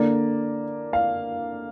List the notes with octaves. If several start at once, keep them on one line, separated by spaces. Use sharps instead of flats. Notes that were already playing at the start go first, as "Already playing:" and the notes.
Already playing: D3 A#3 D5
F5